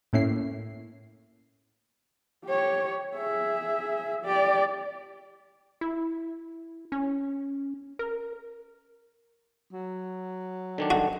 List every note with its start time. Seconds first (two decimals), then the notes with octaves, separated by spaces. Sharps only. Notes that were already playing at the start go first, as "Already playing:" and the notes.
0.13 A2 A3 A#3 C#4 E4 C7
2.45 G4 C#5
3.15 G#4 E5
4.24 G4 D5
5.81 E4
6.92 C#4
7.99 A#4
9.73 F#3
10.78 D3 D#3 D4
10.90 F#4